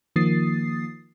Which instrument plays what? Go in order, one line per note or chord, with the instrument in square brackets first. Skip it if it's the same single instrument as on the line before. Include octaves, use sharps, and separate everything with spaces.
[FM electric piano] D#3 F3 A#3 D#6 A6 C7